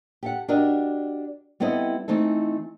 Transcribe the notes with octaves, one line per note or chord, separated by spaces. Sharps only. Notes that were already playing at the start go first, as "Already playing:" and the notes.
G4 A4 F#5
D4 F#4 G4 A#4 D5 D#5
G3 B3 C4 E4 A4 D#5
E3 A3 C4 D#4 A4